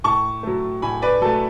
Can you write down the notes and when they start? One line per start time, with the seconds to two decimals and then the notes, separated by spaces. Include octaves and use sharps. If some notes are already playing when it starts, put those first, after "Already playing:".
0.04 A2 A5 C#6
0.43 F#3 A3
0.82 A2 G#5 B5
1.02 B4 D5
1.21 F#3 A3 A4